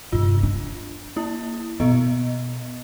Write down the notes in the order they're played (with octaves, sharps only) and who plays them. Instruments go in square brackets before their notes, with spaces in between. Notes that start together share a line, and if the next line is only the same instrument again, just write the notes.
[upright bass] G2 C3 [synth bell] F4
[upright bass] D4
[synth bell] A#3 E4
[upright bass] B2 [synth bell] B3 D#5